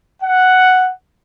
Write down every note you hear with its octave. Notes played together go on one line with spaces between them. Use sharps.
F#5